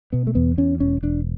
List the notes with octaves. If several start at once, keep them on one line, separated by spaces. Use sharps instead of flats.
B2 B3
A3
E2 B3
E2 C#4
E1 C#4
E1 D4